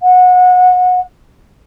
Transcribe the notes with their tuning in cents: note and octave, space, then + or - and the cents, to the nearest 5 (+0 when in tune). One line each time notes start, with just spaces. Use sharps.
F#5 -25